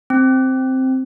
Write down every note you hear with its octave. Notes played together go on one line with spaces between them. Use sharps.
C4